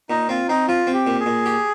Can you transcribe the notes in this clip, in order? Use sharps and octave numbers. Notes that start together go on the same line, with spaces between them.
A#2 D#4
C4 F4
C4 D#4
F3 F4
C4
G4
A#2
G#4
A#2
G4